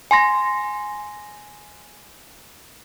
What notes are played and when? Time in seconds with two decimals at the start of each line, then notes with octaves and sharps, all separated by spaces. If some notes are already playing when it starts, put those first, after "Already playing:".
0.11 G#5 C6 A#6